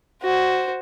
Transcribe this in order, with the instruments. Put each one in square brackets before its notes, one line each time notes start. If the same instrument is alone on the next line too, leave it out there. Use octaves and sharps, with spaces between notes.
[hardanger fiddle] F#4 C5